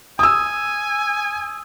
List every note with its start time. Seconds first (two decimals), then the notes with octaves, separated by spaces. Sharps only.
0.19 G#5 D#6 E6